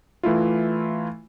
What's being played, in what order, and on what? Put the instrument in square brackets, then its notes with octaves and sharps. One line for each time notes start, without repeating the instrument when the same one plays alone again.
[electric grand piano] E3 A3 E4 F4